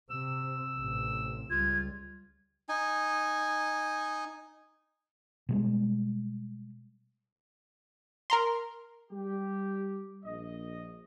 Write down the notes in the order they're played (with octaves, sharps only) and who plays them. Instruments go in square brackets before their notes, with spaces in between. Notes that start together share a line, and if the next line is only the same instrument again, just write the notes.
[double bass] C3 [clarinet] E6
[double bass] A1 C3
[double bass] C#2 G3 [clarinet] F4 [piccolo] G#6
[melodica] D#4 G#5
[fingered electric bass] B2 G3 G#3
[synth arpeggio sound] A#4 A#5 C6
[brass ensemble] G3 G4
A#1 D#5